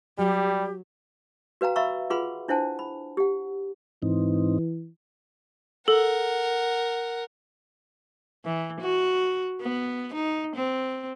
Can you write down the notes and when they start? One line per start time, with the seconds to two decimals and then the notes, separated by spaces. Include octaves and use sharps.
0.18 F#3 G3 G4
1.61 F#4 B4 F5 G5 A#5
1.76 E5 F5 A#5 B5 C#6 E6
2.10 F4 G#4 B4 F#5 B5 C6
2.48 D4 E4 C5 F#5 G#5 A5
2.79 B5
3.17 G4 F#5
4.02 G#2 E3 C4 D#4
5.88 A4 A#4 F#5
8.45 E3
8.81 F#4
9.62 B3
10.14 D#4
10.56 C4